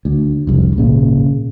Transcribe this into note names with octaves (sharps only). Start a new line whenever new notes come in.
D2
F1 C2 F2
G#1 A#2 C#3